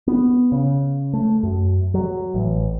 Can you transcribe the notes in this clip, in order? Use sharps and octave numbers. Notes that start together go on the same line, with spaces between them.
B3
C#3
A3
F#2
F#3
A1